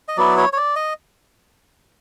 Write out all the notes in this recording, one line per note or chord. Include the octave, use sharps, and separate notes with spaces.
D#5
F#3 B3 E4 D5
C#5
C#5
D5
D#5